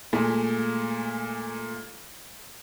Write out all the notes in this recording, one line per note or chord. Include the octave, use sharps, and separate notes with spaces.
A#2 G#3 A3